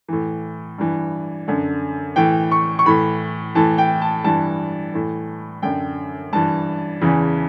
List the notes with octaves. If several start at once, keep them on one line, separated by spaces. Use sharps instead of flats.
A2 E3
G2 E3
F#2 D3
A2 E3 G5
C#6
C#6
A2 E3 B5
A2 E3 A5
G5
A5
G2 E3 A5
A2 E3
F#2 D3 G5
G2 E3 A5
E2 C#3 E3